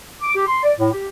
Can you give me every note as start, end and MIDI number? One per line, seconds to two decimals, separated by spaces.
0.22 0.32 86
0.34 0.47 67
0.47 0.61 84
0.63 0.72 74
0.78 0.89 45
0.92 1.08 67